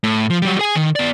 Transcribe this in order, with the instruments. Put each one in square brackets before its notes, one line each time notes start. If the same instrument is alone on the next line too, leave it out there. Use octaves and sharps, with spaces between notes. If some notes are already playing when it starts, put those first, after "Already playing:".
[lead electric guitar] A2
F3
F#3 G3
G#4 G#5
D#3
B3 D5